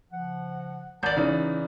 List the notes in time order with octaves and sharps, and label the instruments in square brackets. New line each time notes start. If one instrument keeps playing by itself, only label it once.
[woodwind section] C#3 F3 F#5
[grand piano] G#1 [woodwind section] A#4 A5 [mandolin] D5 G6
[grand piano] C#3 E3 [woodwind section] D#4